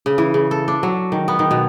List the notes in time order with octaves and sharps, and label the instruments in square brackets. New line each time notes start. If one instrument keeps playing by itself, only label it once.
[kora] C#3
E3
C#3
A4
D4
F#3
D#3
B3
D#3
B2